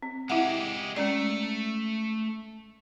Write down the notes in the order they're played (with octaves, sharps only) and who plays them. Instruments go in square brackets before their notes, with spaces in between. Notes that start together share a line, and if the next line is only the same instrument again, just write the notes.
[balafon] C4
[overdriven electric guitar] G#3 G4 [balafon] E4 E5 F#5
[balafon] G#3 C#4 D5 [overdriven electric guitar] A3